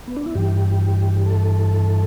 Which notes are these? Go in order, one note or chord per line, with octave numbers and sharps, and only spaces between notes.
B3
D4
E4
G2 E3 G4
A4